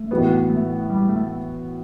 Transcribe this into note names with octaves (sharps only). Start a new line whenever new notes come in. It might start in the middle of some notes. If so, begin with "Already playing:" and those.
Already playing: A3
A2 E3 B3 F#4
A3
G3
A3